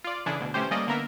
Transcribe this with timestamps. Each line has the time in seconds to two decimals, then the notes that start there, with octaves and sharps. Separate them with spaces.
0.04 F4 D5
0.26 C#3 E3 D4 E4 G#4 A4
0.40 D2 B2
0.54 E3 A3 C#4 G4 C5
0.71 G3 A3 A#3 C#4 D5 D#5
0.87 D3 A#3 B3 A#4 E5